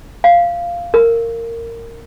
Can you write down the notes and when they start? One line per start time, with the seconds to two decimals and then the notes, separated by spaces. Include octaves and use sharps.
0.24 F5
0.94 A#4